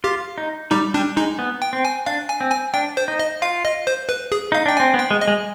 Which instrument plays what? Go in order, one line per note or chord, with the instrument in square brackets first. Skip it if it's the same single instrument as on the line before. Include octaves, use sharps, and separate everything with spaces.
[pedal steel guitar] F4 [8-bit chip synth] G4
[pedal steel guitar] D#4
[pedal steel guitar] G3 [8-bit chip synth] D#4
[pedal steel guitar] G3 [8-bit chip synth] D4
[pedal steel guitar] G#3 [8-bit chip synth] D#4
[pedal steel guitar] B3
[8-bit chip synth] G5
[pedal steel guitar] C4
[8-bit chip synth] G#5
[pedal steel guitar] D4 [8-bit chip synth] F5
[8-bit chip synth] G#5
[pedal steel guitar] C4
[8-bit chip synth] G#5
[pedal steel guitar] D4 [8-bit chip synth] G5
[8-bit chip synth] C5
[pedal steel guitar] D#4
[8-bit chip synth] D#5
[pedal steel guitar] F4 [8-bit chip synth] F5
[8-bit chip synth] D#5
C5
B4
G#4
[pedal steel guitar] D#4 [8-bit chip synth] F5
[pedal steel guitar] D4 [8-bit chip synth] G5
[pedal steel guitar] C4 [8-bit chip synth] G#5
[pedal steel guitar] B3
[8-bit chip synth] G5
[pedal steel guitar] G#3
[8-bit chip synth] D#5
[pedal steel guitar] G#3